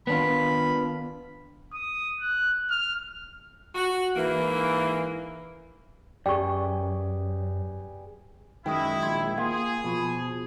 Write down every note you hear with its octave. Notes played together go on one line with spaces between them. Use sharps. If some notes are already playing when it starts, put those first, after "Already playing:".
D#3 B3 D4 F4 B5
D#6
F#6
F6
F#4
G#2 E3 A#3
F#2 G4 G#4 B4 D5 G5 C#6
F#2 D#3 G#3 E4 G5 D#6
A#1 G5 C6 G#6
A#3 F4 G#4 G#6
B2 F3